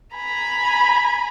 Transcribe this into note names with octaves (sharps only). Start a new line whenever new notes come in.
G#5 A#5 B5